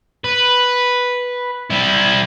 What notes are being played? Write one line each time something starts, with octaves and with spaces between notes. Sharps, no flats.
B4
G3 E4